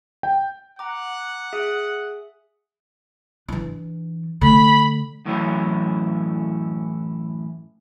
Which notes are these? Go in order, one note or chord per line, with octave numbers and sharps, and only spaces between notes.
G5
F#5 A#5 D6
G#4 E5 D#6
E3 D4
D3 A3 B5
F#2 A2 E3 F#3 C#4 E4